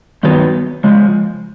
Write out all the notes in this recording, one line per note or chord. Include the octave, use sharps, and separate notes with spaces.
G2 D#3 F#3 B3
C#3 F3 G#3